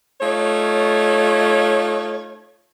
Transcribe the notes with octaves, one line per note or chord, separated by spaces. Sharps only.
A3 D#4 F4 C#5